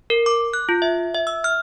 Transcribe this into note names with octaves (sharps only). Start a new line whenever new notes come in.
A#4
D6
F#6
F4
E5
E5
E6
F6